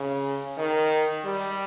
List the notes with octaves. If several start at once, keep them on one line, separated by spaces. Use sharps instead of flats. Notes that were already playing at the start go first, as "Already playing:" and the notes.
Already playing: C#3
D#3
G3